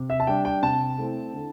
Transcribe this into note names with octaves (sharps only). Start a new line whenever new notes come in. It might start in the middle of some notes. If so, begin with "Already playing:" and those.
Already playing: C3
E5
A5
G3 D4 G5
G5
C3 A5
A3 C4 E4
D3